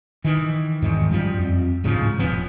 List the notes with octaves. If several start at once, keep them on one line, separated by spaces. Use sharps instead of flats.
D#3 E3
E2 G#2 D#3
F#2 F3 G3
F2
D1 G#2 C#3 F3
E1 F3 B3 C#4